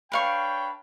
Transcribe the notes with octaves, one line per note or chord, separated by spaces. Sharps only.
D4 B4 C#5 F5 G5 C#6